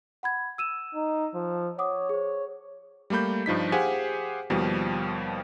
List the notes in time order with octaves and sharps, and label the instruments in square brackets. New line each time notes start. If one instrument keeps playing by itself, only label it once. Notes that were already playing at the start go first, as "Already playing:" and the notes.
[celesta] F#5 B5 G#6
E6 D#7 E7
[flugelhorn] D#4
F3
[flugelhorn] C#5 [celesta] F#5 D6 D#6
[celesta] G#4 C5
[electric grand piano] G3 A3 A#3 B5 G6
G2 F3 D#4 B6
G4 G#4 C5 F5 F#5 G#5
D#2 B2 F3 G3